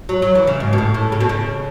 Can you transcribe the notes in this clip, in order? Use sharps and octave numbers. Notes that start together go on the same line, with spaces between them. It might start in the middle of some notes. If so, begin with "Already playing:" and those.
F#3
F#3
E3
C#3
G#2
B2
A2
A2
C#3
B2
C#3